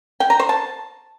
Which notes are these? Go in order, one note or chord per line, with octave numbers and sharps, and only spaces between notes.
G5
A#5
C5
A5